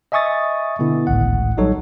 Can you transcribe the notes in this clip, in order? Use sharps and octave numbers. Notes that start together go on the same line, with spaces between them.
D#5 E5 G#5 C#6 D#6 A6
B2 D3 B3 E4
G#1 C#2 A2 F#5
A#1 F#3 G3 D#4 A4 C#5